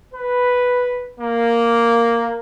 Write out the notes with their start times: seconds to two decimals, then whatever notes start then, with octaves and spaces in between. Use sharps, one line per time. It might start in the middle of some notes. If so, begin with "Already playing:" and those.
0.14 B4
1.20 A#3